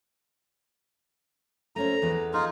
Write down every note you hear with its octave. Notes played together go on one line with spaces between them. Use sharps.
A3 C#4 C5 A#5
E2 E3 B3
D#4 F4 G#4